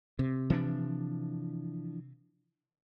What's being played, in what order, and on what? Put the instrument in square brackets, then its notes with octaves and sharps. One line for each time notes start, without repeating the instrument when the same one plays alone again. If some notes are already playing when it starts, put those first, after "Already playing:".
[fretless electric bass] C3
[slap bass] E3 F3 D4